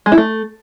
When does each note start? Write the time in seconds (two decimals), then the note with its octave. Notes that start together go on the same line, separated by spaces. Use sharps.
0.06 G#3
0.12 E4
0.18 A3